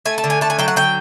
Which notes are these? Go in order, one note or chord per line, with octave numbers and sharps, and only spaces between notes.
A3 G#5
A5
D3
G#5
A3 A5
G#5
F#3 G5
F#5
D3 G5